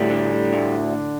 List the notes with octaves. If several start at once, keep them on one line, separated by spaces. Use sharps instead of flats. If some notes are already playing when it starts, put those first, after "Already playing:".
Already playing: D2 A2 G3
D3
D2